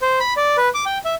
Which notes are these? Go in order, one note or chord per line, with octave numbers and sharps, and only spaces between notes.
C5
B5
D5
B4
D6
G5
E5